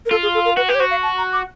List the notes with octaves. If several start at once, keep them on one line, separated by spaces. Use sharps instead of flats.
A#4
F4 A4
G#4
A4
A#4
F#4 B4
G4 B4
C#5
F#4 C5
F5
A5
A#5
D6